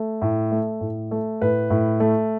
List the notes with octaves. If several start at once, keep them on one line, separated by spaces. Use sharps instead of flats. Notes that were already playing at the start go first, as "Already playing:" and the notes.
Already playing: A3
A2
A3
A2
A3
A2 B4
A2
A3